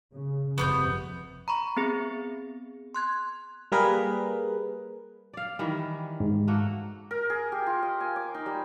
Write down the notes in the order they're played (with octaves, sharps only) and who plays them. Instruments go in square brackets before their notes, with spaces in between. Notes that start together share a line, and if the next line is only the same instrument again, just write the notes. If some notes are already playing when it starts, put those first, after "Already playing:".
[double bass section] C#3
[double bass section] G1 F2 C3 [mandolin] B3 C#6 G6
[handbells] A#5 B5 C#6
B3 C4 G#4 A6
C6 F#6 G#6
[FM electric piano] G3 A#3 G#4 A#4 B4
[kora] D5 F5
D#3 E3 G3
[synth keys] G#2
[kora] A3 A#3 F#4
[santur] A#4
G#4
G4
F4
D#5
G#5
D6
D#4
G3